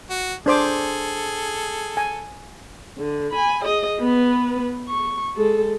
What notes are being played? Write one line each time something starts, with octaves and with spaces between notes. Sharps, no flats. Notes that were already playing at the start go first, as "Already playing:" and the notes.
F#4
D4 G#4 A4 C5 D6
G#5
D3
G#5 B5
G#4 D#5
B3 B4
C#6
G#3 A4